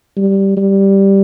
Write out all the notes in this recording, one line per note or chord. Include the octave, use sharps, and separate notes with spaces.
G3
G3